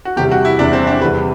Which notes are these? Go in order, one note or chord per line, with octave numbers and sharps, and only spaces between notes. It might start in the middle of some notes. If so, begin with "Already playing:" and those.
F#4
E2 C3 G3 G4
F#4
E4
E2 C3 G3 D4
C4
D4
E2 C3 G3 B4